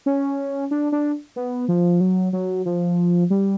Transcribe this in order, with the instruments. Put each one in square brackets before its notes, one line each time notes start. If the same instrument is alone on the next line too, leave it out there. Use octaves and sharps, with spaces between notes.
[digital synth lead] C#4
D4
D4
B3
F3
F#3
F#3
F3
G3